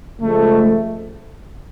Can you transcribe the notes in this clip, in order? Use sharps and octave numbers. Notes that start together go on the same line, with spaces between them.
C#3 F3 G#3 A3